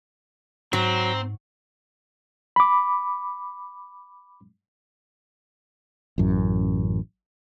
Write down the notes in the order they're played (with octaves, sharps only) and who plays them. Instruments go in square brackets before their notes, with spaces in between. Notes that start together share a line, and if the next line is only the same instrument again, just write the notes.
[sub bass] G#2 [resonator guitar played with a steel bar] F#3 [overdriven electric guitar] C4 [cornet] A#5
[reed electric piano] B5 D6
[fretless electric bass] A1 F#2